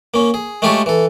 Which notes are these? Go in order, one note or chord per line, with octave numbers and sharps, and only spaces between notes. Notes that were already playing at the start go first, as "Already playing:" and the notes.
A#3 C#4
G#4
G#3 A3 F4 G4 A4 C#5
E3 A4